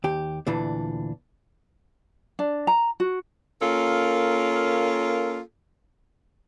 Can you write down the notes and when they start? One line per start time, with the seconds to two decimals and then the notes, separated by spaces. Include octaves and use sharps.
0.04 D#2 G4
0.47 D2 A#2 E3 D4
2.39 D4
2.67 A#5
3.00 F#4
3.61 A#3 C#4 F4 A4 A#4